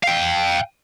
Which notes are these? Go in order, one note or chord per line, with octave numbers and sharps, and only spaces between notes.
F5 G5